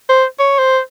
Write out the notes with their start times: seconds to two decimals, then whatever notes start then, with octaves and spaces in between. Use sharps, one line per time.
0.09 C5
0.39 C#5
0.59 C5